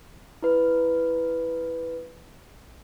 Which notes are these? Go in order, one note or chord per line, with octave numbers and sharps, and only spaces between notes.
E4 B4